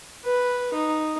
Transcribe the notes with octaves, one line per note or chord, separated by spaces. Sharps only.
B4
D#4